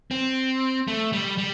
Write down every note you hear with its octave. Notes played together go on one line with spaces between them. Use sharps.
C4
A3
G3
G3